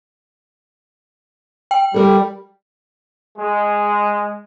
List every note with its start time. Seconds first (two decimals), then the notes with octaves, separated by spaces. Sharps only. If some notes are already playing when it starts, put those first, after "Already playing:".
1.71 G5
1.94 G3 A4 A#4
3.37 G#3